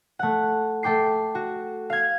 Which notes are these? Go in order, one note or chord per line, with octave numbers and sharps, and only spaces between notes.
A3 F#5
A3 A4 G5 D6 C7
F#4
F5 G#6